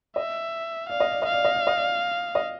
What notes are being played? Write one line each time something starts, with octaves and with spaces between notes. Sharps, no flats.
D#5 E5
D5 F5
D#5
D5
D#5 F5
D5
D#5
D5
D#5
D5
D#5